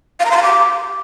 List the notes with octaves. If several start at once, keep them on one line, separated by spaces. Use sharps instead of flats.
F5
A#5
C6
F5
D6